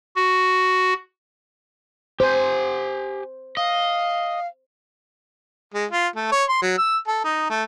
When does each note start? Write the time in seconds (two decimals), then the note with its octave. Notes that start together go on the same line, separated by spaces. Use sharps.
0.16 F#4
2.20 G4 C5 G#5
3.57 D#5 F5
5.74 G#3
5.91 F4
6.16 A3
6.32 C#5
6.49 C6
6.62 F#3
6.78 E6
7.08 A4
7.24 D#4
7.50 A3